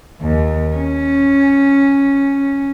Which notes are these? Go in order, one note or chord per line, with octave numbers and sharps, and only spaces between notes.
D#2
C#4